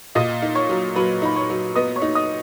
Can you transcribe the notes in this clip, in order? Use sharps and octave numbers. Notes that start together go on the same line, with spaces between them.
A#2 D#5 D#6
D#4
C#5 C#6
F#3
F#3 B4 B5
D#4 B5
C#5 C#6
F#3
B3 D#5 D#6
C#5 C#6
D#4
D#5 D#6